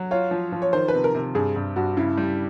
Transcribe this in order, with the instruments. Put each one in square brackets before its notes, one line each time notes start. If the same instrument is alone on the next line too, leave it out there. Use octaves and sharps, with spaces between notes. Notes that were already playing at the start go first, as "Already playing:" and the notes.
Already playing: [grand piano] F#3
[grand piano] F4 [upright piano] C#5
[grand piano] F3
F3
[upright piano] C#5
[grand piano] D#3 [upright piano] C5
[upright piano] B4
[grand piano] C3
[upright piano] A#4
[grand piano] C3
[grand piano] G2 [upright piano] G#4
[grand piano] G2
[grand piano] G2 [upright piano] F#4
[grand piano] C#3 [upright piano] E4
[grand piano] G3